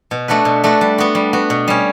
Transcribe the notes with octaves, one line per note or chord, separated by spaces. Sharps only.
B2
A3 D4 F#4 B4
B2
A3 D4 F#4 B4
G3
B3 F#4
G3
B3 F#4
B2
G3 C#4